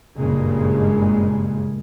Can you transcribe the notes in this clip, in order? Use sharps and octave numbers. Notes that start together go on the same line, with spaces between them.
F#1 G2 A#2 C#3 G#3